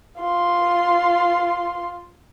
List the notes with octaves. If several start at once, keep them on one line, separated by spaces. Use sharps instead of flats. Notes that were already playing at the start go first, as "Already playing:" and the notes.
F4 C6